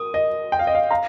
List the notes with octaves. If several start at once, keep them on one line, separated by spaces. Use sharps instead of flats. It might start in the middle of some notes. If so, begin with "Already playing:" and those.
Already playing: A#4 D#6
D#5
G5
F5
D#5
F5
F5 A#5